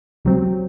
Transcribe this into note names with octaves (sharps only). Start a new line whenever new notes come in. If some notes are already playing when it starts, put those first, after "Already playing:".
C#2 C3 F#3 C4